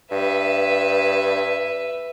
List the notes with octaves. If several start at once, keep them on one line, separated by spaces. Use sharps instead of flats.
G2 B4 E5